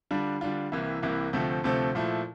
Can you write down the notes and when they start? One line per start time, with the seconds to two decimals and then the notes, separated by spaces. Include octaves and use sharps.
0.11 D3 G3 D4 F4
0.41 D3 G3 D4 F4
0.72 C2 C3 E3 A#3 E4
1.02 C2 C3 E3 A#3 E4
1.33 D2 C3 F3 A3 C4
1.64 D2 C3 F3 A3 C4
1.95 A#2 F3 A3 E4